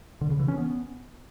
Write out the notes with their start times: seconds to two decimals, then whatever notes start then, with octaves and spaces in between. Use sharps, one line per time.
0.21 D3
0.30 C#3
0.39 E3
0.48 C#4
0.57 B3